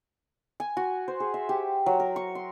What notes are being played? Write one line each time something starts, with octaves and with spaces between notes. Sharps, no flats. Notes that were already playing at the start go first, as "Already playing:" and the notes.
G#5
F#4
C5
G#4
E5
G4
F#3
A#4
C#6
C6